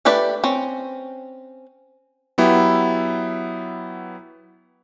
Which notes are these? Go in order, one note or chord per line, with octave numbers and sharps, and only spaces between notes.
A3 D4 G4 B4 D5
C4 C#4
F#3 B3 E4 G4